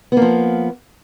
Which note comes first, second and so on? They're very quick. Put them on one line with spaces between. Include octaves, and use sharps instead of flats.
B3 A#3 F3